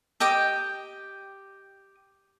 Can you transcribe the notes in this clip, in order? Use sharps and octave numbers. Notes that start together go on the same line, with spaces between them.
G4 D#5 G5 D6